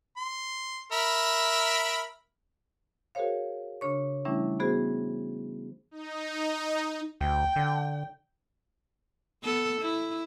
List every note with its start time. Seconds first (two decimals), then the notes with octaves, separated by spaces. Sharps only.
0.17 C6
0.92 A#4 E5 B5
3.15 F#4 G#4 A#4 C5 C#5 F5
3.81 C#3 D4 C#5 C#6
4.25 E3 G3 A3 C#4 D4 E4
4.60 B3 F#4 G#4 C5
5.91 D#4
7.21 D2 G5
7.56 D3
9.43 B3 A4
9.81 E4